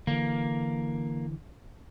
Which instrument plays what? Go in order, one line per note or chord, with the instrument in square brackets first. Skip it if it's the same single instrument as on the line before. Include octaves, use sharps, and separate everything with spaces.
[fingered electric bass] D3 E3 [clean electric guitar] A#3